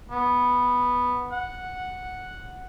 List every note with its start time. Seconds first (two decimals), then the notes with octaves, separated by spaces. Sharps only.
0.11 B3
1.33 F#5